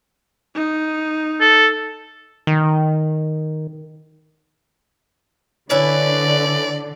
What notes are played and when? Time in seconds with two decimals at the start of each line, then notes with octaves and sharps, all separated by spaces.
0.55 D#4
1.40 A4
2.47 D#3
5.70 D3 C#4 E4 B4 D5